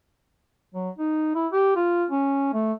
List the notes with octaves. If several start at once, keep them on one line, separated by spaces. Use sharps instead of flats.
F#3
D#4
E4
G4
F4
C#4
A3